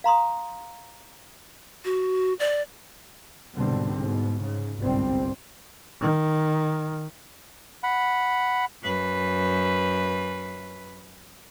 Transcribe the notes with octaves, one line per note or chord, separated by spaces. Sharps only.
F5 A#5 C6 D#6
F#4
D5
C2 G#2 B2 D3 G3 C4
G#2 B2
G#2 C#3
G1 C2 G#2 G3 C4
D#3
F#5 B5
F#2 B4